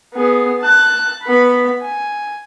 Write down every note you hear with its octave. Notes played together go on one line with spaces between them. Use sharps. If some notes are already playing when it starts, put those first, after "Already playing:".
B3 G#4
A5 F#6
B3 B5
G#5